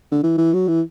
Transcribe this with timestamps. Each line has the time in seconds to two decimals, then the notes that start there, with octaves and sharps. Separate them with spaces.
0.12 D3
0.23 E3
0.38 E3
0.53 F#3
0.68 E3